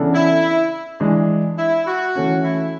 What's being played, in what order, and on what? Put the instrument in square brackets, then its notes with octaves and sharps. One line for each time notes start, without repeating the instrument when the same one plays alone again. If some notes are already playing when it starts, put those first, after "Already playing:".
Already playing: [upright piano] C#3 E3 B3 D4 A4
[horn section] E4
[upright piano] E3 G#3 D4
[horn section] E4
F#4
[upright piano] E3 A3 C#4
[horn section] E4